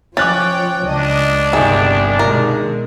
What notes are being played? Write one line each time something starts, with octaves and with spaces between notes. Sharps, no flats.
F3 C#4 C#5 G5 D6 F#6 A6
C#2 D4 D#5
G1 C2 D#3 G#4
B2 D#3 G#3 A#4